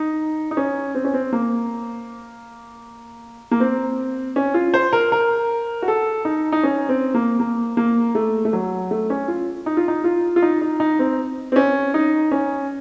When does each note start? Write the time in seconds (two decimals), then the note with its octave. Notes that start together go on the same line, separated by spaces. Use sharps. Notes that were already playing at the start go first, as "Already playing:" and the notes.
Already playing: D#4
0.51 D#4
0.57 C#4
0.95 C4
1.05 C#4
1.14 C4
1.33 A#3
3.51 A#3
3.60 C4
4.36 C#4
4.54 F4
4.74 C5
4.93 A#4
5.12 A#4
5.82 F#4
5.88 A4
6.25 D#4
6.52 D#4
6.63 C#4
6.89 C4
7.14 A#3
7.40 A#3
7.77 A#3
8.15 A3
8.45 A3
8.53 F#3
8.91 A3
9.10 C#4
9.28 F4
9.66 D#4
9.77 F4
9.88 D#4
10.04 F4
10.36 F4
10.42 D#4
10.61 D#4
10.80 D#4
10.99 C4
11.52 C4
11.56 C#4
11.94 D#4
12.32 C#4